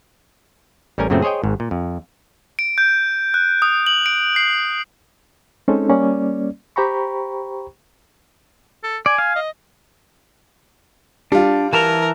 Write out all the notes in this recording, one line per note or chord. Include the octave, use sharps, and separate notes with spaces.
A1 G3 C#4 A#4 G#5
F#2 A#2 C#3 A3 C4 F#4
G#4 C5 C#5 D#5 G5
G#1 G#2
A#2
F2
D7
G6
F#6
D#6
F#7
D7
C7
G#3 C4 C#4 D#4 A4
G3 A#3 C#4 D5
G4 C5 G5 A#5 B5 C#6
A4
D5 G#5
F5
D#5
G3 D4 F4
E3 A#4 A5 A#5